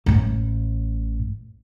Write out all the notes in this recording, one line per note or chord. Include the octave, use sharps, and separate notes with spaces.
A1 A2